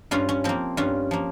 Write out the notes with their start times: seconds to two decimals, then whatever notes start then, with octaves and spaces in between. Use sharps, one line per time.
0.11 G2 C#4 F4
0.29 C#4
0.44 F3 A#3 C4
0.77 G2 C#4 F4
1.11 F3 A#3